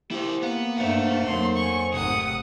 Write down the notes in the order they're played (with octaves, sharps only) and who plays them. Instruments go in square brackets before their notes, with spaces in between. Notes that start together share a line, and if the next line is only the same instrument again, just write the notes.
[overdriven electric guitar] E4 C5 [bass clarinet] G4
[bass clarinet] A#3 [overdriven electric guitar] B3
[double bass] G2 [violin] A3 D4 [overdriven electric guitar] C5 F#5
[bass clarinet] F2 [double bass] F#3 A#3 [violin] C6
[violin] G#5 C#6
[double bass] G#1 A3 [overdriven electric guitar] C3 [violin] F#5 D#6